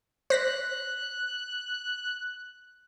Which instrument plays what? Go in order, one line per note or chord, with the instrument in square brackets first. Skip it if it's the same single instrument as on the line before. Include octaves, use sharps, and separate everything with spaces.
[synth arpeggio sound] C5 A#6 B6 [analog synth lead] F#6